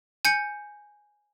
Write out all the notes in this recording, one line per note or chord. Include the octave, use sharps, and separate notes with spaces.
G#5 G6 C#7